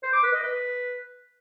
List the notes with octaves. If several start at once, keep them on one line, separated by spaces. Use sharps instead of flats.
C5
D6
B4
D#5
B4